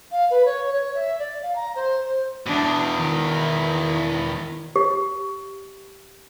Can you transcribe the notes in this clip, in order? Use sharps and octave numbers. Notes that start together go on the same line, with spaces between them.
F5
B4
C#5
C#5
E5
D5
F5
A#5
C5
C5
E2 B2 D4
D#3 E4
G4